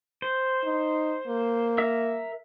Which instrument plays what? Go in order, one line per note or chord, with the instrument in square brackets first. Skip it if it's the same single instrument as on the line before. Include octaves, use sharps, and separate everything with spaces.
[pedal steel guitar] C5
[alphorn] D#4
A#3
[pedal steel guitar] A#4 E5 E6